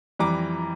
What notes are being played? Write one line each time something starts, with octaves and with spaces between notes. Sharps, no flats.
F2 E3 G3 A#5 D6